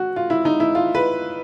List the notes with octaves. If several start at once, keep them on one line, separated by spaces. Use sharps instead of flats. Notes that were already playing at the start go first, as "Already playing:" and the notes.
Already playing: F#4
F4
E4
D#4
E4
F4
B4